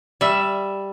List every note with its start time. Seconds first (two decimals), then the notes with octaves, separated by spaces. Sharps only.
0.21 G3 E5